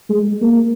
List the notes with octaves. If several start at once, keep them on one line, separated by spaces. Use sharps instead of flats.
G#3
A#3